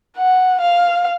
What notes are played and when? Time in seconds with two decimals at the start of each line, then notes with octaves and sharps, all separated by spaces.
0.17 F#5
0.61 F5